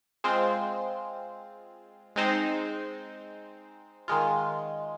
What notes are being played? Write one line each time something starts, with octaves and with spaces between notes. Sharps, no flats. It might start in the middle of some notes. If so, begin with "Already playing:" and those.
G#3 C4 F4 C5
G#3 C4 D#4 C5
D#3 G#3 F4